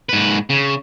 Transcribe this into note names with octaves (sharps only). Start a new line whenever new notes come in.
G#2 B4
C#3